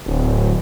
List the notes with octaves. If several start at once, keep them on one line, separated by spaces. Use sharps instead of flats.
D1